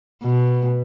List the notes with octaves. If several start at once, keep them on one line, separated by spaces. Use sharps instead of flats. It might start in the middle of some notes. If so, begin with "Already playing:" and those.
B2